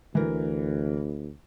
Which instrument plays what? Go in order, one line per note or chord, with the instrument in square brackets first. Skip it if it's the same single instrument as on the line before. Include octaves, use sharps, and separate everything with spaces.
[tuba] D2 [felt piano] E3 A#4